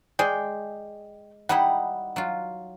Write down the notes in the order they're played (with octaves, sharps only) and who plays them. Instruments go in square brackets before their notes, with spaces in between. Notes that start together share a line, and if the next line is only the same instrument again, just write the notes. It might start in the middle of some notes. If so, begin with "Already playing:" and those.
[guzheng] G#3 [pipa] G#4 D5 G5
[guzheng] G3 D#4 E4 [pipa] F#5
[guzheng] F#3 F4